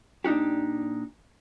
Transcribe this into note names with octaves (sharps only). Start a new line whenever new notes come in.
A#2 D4 D#4 F#4 G4